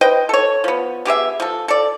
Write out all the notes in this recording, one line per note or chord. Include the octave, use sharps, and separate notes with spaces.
B4 C5 D#5 G5
A4 C#5
F3 B3
B3 G4 G#4 E5
F3 A4
A4 D5